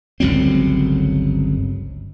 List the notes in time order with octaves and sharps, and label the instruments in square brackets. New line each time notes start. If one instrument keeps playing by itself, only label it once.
[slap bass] G1 C#2 F#3 C4